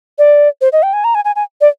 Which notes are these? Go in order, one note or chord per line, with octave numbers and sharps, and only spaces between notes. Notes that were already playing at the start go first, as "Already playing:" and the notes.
D5
C5
D#5
G5
G#5
A#5
G#5
G#5
G#5
D5